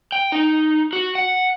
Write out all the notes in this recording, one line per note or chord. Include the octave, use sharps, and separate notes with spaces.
G5
D#4
F#4
F#5